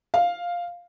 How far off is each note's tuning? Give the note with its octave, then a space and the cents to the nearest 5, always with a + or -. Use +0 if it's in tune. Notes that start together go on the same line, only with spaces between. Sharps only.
F5 +5